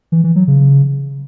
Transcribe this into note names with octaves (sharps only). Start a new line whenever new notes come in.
E3
E3
F#3
C#3